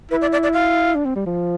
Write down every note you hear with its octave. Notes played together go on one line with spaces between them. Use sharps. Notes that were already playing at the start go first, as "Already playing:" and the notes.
E4 B4
D5
D5
D5
F5
D4
C4
G3
F3